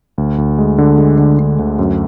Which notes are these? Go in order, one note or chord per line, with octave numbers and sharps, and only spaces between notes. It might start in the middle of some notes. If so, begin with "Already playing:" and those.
D2
D2
G#3
D3
G#3
D3
D3
D2
F#2